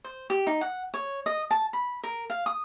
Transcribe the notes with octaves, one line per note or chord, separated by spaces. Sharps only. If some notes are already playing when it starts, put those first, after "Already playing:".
C5
G4
D#4
F#5
C#5
D#5
A5
B5
A#4
F5
D#6